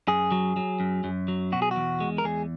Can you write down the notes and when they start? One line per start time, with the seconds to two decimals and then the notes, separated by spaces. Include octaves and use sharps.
0.08 F#2 G#4
0.32 F#3
0.56 F#3
0.80 F#2
1.04 F#2
1.28 F#3
1.52 B2 F#4
1.62 G#4
1.71 F#4
1.76 E2
2.00 G#3
2.18 A#4
2.24 E2 G#4